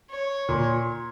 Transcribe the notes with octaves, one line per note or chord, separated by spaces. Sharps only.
C#5
A#2